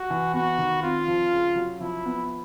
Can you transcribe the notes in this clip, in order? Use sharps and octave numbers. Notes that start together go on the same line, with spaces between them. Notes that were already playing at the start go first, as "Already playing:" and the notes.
Already playing: F#4
E3
B3 F#4
D#3
C4 F4
F3
C#3
F#3
F3 E4
B3